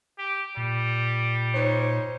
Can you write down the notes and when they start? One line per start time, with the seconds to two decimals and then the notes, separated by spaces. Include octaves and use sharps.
0.18 G4
0.57 A#2 G3
1.53 D#4 C5 C#5